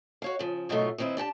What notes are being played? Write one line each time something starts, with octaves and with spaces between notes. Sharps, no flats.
F#4 C#5 F5
C#3 F3
G#2 B2 D#3 F#3 A3 F4
D#2 D#3 C4 E4 B4
D4 G4 G5 A5